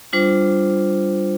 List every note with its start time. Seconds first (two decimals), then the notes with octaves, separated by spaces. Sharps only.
0.13 G3 D4 F4 C5